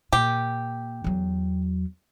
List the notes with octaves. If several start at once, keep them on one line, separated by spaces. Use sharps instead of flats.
A#2 G4
E2 F#3